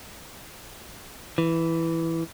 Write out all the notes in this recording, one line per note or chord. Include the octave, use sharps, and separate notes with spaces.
E3